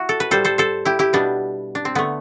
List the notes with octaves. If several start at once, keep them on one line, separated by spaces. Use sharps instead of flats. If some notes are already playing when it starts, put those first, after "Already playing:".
Already playing: E4 F#4
A4
B4
A2 G3 A4 C5
A4 C5
A4 C5
E4 G4
E4 G4
B2 G3 B3 D4
D4
C4
D3 A3 B3